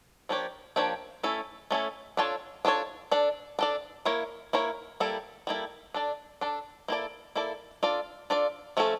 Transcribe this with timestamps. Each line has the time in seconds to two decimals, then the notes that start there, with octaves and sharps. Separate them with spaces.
0.29 F3 A#3 D4 G4 C#5
0.76 F3 A#3 D4 G4 C#5
1.23 A3 C#4 E4 A4
1.71 A3 C#4 E4 A4
2.17 D4 F4 A4 C#5
2.65 D4 F4 A4 C#5
3.11 D4 A4 D5
3.59 D4 A4 D5
4.05 A#3 E4 A#4 C#5
4.53 A#3 E4 A#4 C#5
5.00 G3 A#3 E4 A4
5.47 G3 A#3 E4 A4
5.94 D4 A4 D5
6.41 D4 A4 D5
6.88 A#3 E4 A4 D5
7.35 A#3 E4 A4 D5
7.83 D4 F4 A4 D5
8.30 D4 F4 A4 D5
8.77 F3 A3 C#4 E4 A4